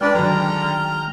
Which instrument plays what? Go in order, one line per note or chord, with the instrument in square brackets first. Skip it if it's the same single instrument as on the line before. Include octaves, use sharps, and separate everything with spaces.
[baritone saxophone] C#2 [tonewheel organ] G#3 G5 F6 [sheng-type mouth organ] D4 B4 D5
[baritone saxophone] D3 [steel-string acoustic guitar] D#3 F#3 [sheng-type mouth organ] A#5